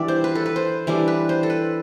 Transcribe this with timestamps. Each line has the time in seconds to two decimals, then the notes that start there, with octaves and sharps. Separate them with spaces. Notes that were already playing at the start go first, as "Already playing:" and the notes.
Already playing: E3 G3 D4 D5 E5
0.08 C5
0.24 B4
0.35 A4
0.46 B4
0.56 C5
0.87 E3 G3 D4
1.08 B4
1.29 C5
1.43 A4
1.50 B4